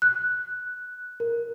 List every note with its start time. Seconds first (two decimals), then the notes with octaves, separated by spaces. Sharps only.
0.02 F#6
1.20 A#4